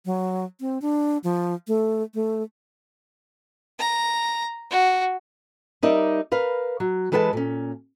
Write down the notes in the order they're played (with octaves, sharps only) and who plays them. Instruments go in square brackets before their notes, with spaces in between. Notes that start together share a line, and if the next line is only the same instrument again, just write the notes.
[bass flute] F#3
C4
D4
F3
A3
A3
[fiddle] A#5
F#4
[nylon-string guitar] G3 D#4 A#4 D5 E5
A#4 B4 F5
F#3
E3 G#3 A4 B4 G#5 A5
A#2 C#4